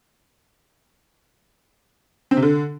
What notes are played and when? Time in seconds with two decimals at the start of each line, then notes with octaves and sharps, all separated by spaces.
2.31 C4
2.37 C3
2.43 D3